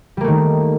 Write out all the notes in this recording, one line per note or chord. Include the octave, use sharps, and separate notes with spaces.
D#3 G3 A3 A#3